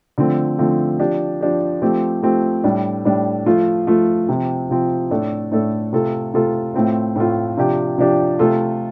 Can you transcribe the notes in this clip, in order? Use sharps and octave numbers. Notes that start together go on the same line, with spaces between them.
D3 F3 A3 C4
D3 F3 A3 C4
F3 D4 G4
F3 D4 G4
F3 A3 C4 G4
F3 A3 C4 G4
A2 G3 D4
A2 G3 D4
F3 A3 F4
F3 A3 F4
C3 F3 C4
C3 F3 C4
A2 A3 D4 A4
A2 A3 D4 A4
C3 A3 F4 A4
C3 A3 F4 A4
A2 A3 C4 F4
A2 A3 C4 F4
C3 F3 D4 G4
C3 F3 D4 G4
C3 A3 F4 A4